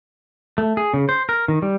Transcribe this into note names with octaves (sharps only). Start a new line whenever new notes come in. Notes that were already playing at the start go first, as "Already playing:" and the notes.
A3
G#4
C#3
C5
A#4
D#3
G3